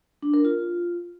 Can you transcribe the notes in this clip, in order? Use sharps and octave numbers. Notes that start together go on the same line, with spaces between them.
D4
A#4
F4